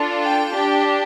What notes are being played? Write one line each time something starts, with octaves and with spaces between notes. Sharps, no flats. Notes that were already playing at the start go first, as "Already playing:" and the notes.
Already playing: D4 F4 A4
G5
D4 G4